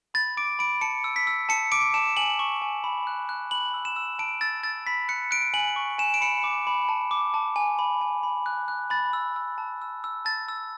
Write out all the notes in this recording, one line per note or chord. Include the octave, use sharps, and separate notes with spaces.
B5 A6
D6 D7
B5 D7
A5 C#7
E6
B6
E6
A5 C#7
D6 D7
A5 E7
G#5 F#7
C#6
G#5
B5
F#6
F#6
B5 F#7
E6
E7
E6
A5 D7
E6 A6
E6 A6
B5 B6
F#6 C#7
F#6 D7
G#5 F#7
C#6
G#5 E7
D7
B5 C#7
D6
B5
A5
D6
A5
G#5
B5
G#5
B5
F#6
F#6
B5 A6
E6
E6
A5
E6
E6
A5 A6
E6